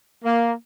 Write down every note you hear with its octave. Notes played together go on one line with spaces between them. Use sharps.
A#3